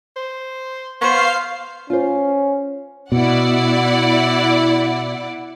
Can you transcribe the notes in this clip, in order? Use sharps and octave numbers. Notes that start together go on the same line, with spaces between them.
C5
B3 C5 F5 C#6 C7
C#4 F4 C5
B2 E4 D5 F#5